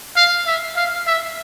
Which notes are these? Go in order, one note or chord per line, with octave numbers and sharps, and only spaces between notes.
F5
E5
F5
E5